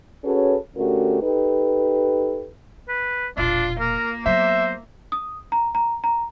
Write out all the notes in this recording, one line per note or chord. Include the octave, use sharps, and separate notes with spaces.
C#4 F#4 G#4 A4 B4 C#5
D3 A3 C#4 F#4 G4 A#4
D#4 G4 A4 B4
B4
E1 A#1 D4 F4
A#3 A#4
F#3 B3 C5 E5
D#6
A#5
A#5
A#5